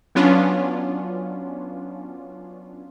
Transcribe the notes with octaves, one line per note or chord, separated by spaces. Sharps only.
F#3 B3 C#4 D4 F4